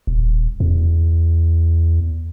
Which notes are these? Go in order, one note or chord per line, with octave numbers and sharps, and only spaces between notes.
D#1
E2